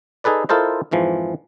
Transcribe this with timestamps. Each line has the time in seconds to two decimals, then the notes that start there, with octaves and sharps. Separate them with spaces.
0.24 D#4 G#4 A4 B4 D5
0.49 E4 F4 A4 A#4 C5 D#5
0.91 F2 G#2 E3 F3